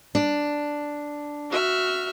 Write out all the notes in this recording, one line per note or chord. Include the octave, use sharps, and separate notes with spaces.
D4
F#4 E5 F6